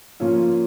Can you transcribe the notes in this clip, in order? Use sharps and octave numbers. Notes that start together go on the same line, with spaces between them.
A#2 F3 A#3 C#4 F4